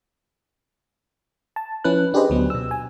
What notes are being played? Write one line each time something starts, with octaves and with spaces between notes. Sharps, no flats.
A5
F3 C#4 E4 B4 F#6
D4 G4 G#4 B4 C5 D#5
D2 F#3 B3
B2 E6
G#5